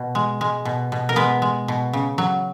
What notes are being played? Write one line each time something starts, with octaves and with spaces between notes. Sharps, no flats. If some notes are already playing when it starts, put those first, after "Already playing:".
Already playing: B2
G#3
G#3
B2
B2
A#4
G#3 B3 B4
G#3
B2
C#3
F#3